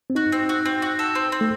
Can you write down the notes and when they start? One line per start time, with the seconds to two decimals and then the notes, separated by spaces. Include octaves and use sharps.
0.10 C4
0.15 D#4 F#4
0.32 C4
0.49 F#4
0.66 C4
0.82 F#4
0.99 A4
1.15 C4
1.32 C4
1.41 A3